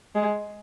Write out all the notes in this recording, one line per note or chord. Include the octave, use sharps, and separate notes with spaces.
G#3